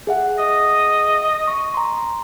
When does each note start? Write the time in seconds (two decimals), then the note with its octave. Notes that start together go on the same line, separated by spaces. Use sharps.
0.07 G#4 E5 F#5
0.38 D#5
1.48 C#6
1.74 A#5 C6